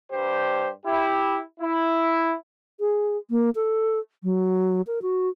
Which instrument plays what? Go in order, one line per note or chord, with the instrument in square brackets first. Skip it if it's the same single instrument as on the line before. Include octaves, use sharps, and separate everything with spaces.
[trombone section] G2 G3 G4 C5
E4 G4
E4
[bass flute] G#4
A#3
A4
F#3
A#4
F#4